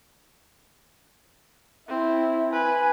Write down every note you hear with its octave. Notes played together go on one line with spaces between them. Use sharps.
C4 E4
B4 G#5